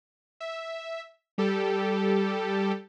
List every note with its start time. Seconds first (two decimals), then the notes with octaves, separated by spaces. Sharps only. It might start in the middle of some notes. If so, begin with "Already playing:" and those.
0.40 E5
1.38 G3 G4 A4